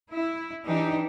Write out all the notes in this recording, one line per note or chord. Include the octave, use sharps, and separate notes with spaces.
E4
E3 D4 D#4 G4